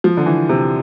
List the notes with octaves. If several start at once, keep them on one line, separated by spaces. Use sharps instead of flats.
F3
D3
E3
C3